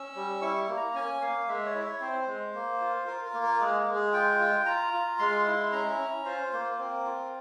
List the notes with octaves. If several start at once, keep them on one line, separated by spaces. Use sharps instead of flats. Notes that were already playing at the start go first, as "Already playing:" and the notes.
Already playing: C#4 E6
G3
E4 C#6
A#3
A#5
C#4 G#5
A#3 F5
G#3 E5
C#5
E4 E5
C#5
C4 C5
G#3
A#3
F4
F4 A#4
A#4
A#3
A#4
G#3 G#4
G#3
G#4
F4 G5
F4
F4 A#5
F4
G#3 C6
E4
C#4 A#5
C#4
F4 C5
A#3 C5
C5
C4 A#4
F4